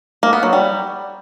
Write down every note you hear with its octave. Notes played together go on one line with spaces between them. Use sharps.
A#3
B3
F#3
G3